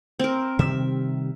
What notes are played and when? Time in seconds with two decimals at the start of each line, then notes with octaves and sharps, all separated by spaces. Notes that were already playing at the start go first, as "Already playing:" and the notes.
0.19 C4 A#4
0.59 C3 D#3 G3 E5